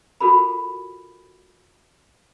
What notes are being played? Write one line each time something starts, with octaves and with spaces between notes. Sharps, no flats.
F4 F#4 A4 A#4 B5